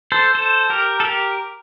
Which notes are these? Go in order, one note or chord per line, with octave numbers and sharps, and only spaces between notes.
A4 C5
A4 C5
G4 A#4
A4
G4 A#4